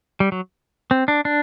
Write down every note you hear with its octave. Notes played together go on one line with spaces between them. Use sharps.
G3
F#3
C4
D4
D4